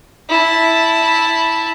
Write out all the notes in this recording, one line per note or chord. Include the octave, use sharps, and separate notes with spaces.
E4 A5